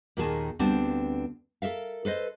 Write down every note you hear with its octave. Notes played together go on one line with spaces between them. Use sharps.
D#2 A#2 D#3 A#3 G#4 A5
D2 G3 B3 C4 D4 A5
A4 A#4 E5 F5
A4 B4 C5 D#5